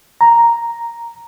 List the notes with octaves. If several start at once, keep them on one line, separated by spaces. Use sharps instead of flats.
A#5